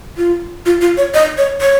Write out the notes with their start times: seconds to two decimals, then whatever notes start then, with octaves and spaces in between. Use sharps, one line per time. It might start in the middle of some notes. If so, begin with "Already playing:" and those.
0.17 F4
0.66 F4
0.81 F4
0.97 C#5
1.14 D#5
1.38 C#5
1.61 C#5